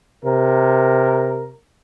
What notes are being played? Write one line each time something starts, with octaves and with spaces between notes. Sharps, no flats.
C3 A#4